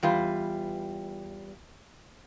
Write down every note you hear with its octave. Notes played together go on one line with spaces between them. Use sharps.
E2 G3 F4 B4